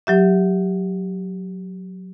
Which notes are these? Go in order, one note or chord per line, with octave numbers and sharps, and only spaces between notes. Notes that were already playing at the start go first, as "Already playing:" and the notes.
F#3 G4 E5